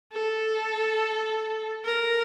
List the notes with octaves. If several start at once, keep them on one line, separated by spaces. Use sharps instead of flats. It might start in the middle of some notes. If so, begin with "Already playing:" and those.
A4
A#4